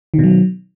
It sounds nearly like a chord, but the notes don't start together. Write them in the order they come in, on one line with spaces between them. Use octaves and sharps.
D#3 B2 F#3